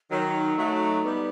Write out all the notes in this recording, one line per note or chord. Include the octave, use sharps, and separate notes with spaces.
D#3 F#3 D#4
F#3 A3
G3 B3